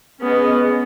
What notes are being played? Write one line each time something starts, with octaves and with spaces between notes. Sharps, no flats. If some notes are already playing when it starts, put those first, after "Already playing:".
B3 C#4 G#4 D#5